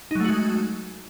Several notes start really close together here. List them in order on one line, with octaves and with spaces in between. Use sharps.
D#4 F#3 A3 F#4 G#3